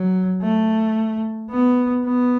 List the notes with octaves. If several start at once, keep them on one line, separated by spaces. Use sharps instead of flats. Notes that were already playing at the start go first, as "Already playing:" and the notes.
Already playing: F#3
A3
B3
B3